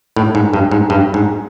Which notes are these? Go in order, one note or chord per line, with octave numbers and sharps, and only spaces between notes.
A2
G#2
G2
G#2
G2
G#2